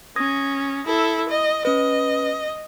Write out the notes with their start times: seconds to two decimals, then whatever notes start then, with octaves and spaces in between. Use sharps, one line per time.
0.16 C#4 D#6 G#6 A#6
0.86 E4 A4
1.29 D#5
1.65 C#4 B4 D#5